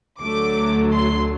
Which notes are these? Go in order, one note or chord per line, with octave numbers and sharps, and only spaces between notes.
D2 D3 F#3 A3 D6
C6